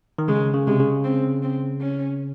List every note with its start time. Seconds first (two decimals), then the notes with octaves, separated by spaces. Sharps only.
0.19 D#3
0.28 C#3 G#3
0.54 C#3
0.67 C3 G#3
0.79 C#3
1.04 C4
1.42 C4
1.81 C#4